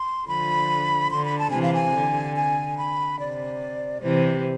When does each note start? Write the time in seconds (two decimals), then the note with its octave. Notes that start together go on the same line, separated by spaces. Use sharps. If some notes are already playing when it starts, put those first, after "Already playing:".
Already playing: C6
0.28 D3 F3 B5
1.11 D3 C6
1.25 B5
1.39 A5
1.50 C3 E3 G#5
1.62 F5
1.74 G#5
1.95 D3
2.36 G#5
2.78 B5
3.19 C3 D5
4.02 C3 E3 C5